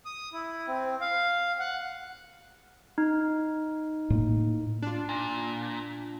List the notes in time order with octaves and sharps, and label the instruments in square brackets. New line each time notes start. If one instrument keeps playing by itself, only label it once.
[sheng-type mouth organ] D#6
E4
C4
F5
F#5
[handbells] D#4
[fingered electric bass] A2 A#3
[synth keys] D4 F4
[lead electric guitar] A#2